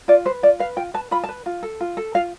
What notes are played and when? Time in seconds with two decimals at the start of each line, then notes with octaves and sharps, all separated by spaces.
0.08 F4 D5
0.25 B4 C5
0.43 F4 D5
0.59 B4 F5
0.76 F4 G5
0.94 B4 A5
1.11 F4 B5
1.24 A5
1.29 B4
1.46 F4
1.63 A4
1.80 F4
1.97 A4
2.14 F4 F5